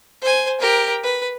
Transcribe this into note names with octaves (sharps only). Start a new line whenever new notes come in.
C5 G#5
G4 A#4
B4